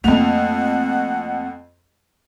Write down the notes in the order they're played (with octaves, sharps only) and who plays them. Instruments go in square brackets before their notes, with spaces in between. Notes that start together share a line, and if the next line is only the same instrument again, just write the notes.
[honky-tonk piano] F2 F7 [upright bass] A3 A#3 [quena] F#5